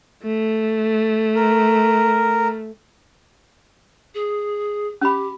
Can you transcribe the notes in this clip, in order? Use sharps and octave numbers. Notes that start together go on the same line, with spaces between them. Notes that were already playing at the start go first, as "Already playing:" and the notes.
A3
A#4
G#4
C#4 G4 B5